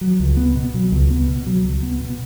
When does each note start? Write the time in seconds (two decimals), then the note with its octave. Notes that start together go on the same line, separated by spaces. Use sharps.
0.01 F#3
0.20 C#2
0.37 B3
0.56 B2
0.74 F#3
0.92 C#2
1.11 B3
1.28 B2
1.47 F#3
1.64 C#2
1.83 B3
2.01 B2